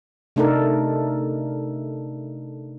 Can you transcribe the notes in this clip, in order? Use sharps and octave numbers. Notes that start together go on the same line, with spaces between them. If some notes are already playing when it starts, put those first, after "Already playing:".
C3 A3 D4 D#4 A4 A#4